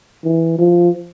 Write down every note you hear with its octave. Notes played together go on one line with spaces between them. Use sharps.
E3
F3